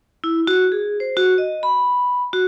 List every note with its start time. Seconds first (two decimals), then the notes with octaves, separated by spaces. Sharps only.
0.24 E4
0.47 F#4
0.72 G#4
1.00 C5
1.17 F#4
1.38 D#5
1.63 B5
2.33 F#4